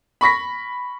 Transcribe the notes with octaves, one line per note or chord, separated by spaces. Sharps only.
B5 C#6 A#6 B6